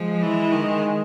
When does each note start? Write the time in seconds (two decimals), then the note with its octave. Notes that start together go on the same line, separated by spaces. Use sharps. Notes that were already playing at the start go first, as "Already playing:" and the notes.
Already playing: F3 G#3
0.22 E3
0.52 D#3